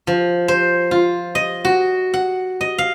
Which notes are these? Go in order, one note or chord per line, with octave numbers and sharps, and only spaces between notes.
F3
C5
F4
D#5
F#4
F#5
D#5
F5